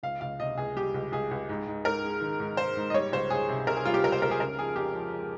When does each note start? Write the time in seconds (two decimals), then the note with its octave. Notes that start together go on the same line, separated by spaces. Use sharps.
0.03 C#2 F5
0.21 C#2 F5
0.40 C3 D#5
0.58 C#2 G#4
0.75 G3 G4
0.94 C#2
1.12 C#2 G#4
1.31 C#2
1.49 G#2
1.67 G#2
1.85 G#2 A#4
2.04 G#3
2.21 D#3
2.40 G#2
2.57 G#3 C5
2.77 G#2
2.90 D#5
2.94 G3 C#5
3.12 C#2 C5
3.30 C#2 G#4
3.49 C3
3.67 C3 A#4
3.76 G#4
3.85 G3 F4
3.94 G4
4.03 C#2 A#4
4.12 C5
4.22 C#2 A#4
4.31 G#4
4.40 C#3 A#4
4.58 F3 G#4
4.76 F2 G4
4.95 F3
5.13 G#3